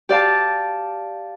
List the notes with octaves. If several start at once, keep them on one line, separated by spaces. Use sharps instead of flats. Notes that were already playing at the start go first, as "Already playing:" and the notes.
G4 D5 F5 A5